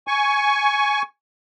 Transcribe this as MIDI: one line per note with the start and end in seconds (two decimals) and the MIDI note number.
0.08 1.02 80
0.08 1.02 85